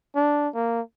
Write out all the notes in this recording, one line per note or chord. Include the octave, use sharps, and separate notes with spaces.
D4
A#3